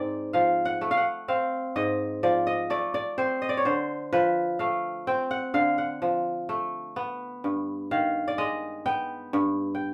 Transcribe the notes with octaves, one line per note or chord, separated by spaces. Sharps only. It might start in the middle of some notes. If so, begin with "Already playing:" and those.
Already playing: G#2 C4 D5
F3 F5
F#5
A3
F5
F#5
C4 F5
G#2 D#5
F3 D5
D#5
A3 D5
D5
C4 C5
D#5
D5
C#5
D3 C5
F3 B4
A3 F5
C4 G5
F#5
D3 F5
F#5
F3
A3
B3
G2
D#3 F5
D5
G#3 D#5
B3 G5
G2
G5